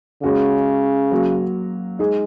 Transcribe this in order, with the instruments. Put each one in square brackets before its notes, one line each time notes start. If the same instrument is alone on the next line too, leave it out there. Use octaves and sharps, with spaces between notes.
[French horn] C#3 [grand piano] G#3 C#4 F#4
[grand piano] F#3 A#3 F#4
G#3 D#4 G#4